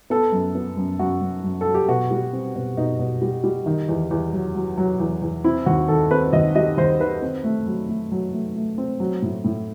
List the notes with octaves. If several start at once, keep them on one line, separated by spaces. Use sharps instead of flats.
B3 A4
F#2
B3
F#2
F#2 F#4
F#2
F#2
A4
F#3
G4
B2 F#4
G3
C4
B2
B2 D#4
B2
G3
G3
D#3
E2
E2
F#3
F#3
F#3
E2
E2
C4 E4
D#2 F#4
D#3 A4
C4 B4
D#2 D#5
G3 D#5
D#2 C5
D#3 B4
C4
A3
F#3
A3
F#3
A3
A3
C4
F#3
A2
A2